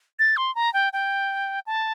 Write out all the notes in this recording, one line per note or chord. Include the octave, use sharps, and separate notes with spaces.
A6
C6
A#5
G5
G5
A5